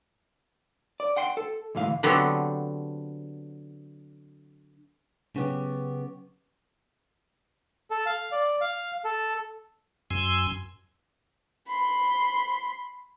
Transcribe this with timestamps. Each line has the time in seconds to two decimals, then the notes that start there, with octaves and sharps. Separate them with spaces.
1.00 D5
1.16 F#5 G5 C6
1.37 A4
1.75 D2 G#2 E3 G#3 F5
2.03 D3 F#3 B3 C4 G4 A4
5.36 C#3 F#3 B3 C#4 G4 C#6
7.91 A4
8.06 F5
8.32 D5
8.61 F5
9.04 A4
10.10 F#2 G#5 C6 E6
11.68 B5 C6